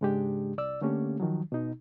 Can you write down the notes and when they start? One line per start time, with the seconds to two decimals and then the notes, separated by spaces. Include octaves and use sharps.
0.01 G#2 C#3 G#3 D4 G4
0.58 C2 D5 E6
0.81 D3 A3 A#3 C#4 G4
1.20 D#3 F3 F#3
1.52 B2 D#4